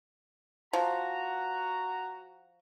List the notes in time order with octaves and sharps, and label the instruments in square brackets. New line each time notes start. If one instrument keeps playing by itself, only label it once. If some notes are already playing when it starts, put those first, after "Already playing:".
[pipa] F3 [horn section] F#4 A#5